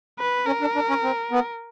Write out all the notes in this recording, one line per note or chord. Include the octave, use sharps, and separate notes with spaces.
B4
C#4 A#4
D4
D4
C#4
C4
B3